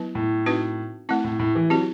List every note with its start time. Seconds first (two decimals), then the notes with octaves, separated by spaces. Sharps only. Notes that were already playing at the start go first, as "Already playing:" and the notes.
Already playing: F#3 B3 E4 B4
0.15 A2
0.46 C4 D#4 F#4 B4
1.09 A3 C4 E4
1.24 A2
1.39 A2
1.55 E3
1.70 F#3 C4 E4 G4